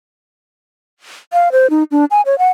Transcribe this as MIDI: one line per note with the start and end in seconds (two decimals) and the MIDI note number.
1.33 1.52 77
1.52 1.70 72
1.70 1.83 63
1.91 2.05 62
2.11 2.21 80
2.26 2.38 73
2.38 2.50 78